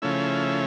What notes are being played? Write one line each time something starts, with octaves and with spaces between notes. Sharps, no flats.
C#3 F3 A3 C#4 E4